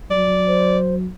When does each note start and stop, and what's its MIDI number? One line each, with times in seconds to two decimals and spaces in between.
0.10 1.08 54
0.10 0.78 74
0.47 0.95 72